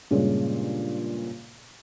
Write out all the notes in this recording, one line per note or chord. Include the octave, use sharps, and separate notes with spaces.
G2 A#2 C#3 G#3 F4